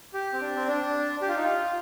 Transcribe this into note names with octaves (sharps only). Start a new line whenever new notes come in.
G4
C4
D4
C4
D4
G4
F4
D#4
F4